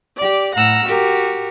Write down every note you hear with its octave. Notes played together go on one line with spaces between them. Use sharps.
G4 D5
A2 F#5 A#5 E6 F6
F#4 G4 A#4